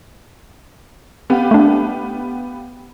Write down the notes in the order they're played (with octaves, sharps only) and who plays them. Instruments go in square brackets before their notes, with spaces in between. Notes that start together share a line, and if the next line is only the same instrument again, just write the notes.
[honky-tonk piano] B3 G4 F5
[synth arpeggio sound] A3 D4